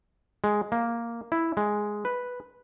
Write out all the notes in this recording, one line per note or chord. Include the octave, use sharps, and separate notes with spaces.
G#3
A#3
E4
G#3
B4